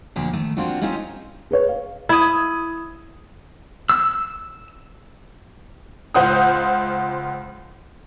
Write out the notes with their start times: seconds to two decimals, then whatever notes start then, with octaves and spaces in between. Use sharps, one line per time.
0.16 D2 A#2 F3 D4
0.33 D#3 A3
0.57 A#3 C4 D4 F4 F#4
0.81 C4 C#4 D#4 F4 G4 C5
1.51 G#4 B4 C#5
1.69 F5
2.09 E4 D#6 G#6
3.89 E6
6.14 C#2 F4 C5 F#5 D#6